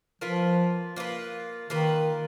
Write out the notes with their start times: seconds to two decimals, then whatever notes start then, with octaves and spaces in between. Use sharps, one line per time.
0.21 F3 A#3 F4 B4
0.96 A#3 F4 B4
1.70 D#3 A#3 F4 B4